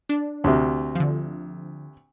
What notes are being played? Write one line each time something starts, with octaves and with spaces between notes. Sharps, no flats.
D4
D2 C3
D3 F3